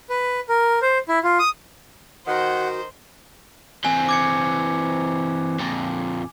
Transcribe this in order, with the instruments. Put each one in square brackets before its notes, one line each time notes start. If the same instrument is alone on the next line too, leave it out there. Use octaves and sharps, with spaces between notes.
[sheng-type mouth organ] B4
A#4
C5
E4
F4
D#6
[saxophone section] D#3 [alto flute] F#4 [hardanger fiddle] C5 [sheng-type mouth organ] F#5
[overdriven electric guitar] E3 C4 [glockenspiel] G#5
[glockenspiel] D6 G#6 C#7
[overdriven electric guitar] F2 A#2